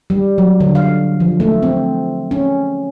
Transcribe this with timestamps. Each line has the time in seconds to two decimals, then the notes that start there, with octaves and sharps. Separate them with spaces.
0.10 G3
0.38 F#3
0.60 D3
0.75 F5
1.20 F3
1.40 A3
1.63 C4
2.31 C#4